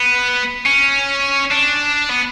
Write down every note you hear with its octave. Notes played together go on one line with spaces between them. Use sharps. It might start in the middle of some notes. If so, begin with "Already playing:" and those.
Already playing: B3
C#4
D4
B3